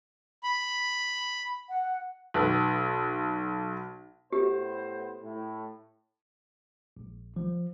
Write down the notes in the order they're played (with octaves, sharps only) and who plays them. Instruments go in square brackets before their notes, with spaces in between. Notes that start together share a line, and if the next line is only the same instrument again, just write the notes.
[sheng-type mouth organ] B5
[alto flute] F#5
[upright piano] B1 B4
[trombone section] A2 B3 C5 [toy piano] G4
[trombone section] A2
[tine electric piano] A#1
F3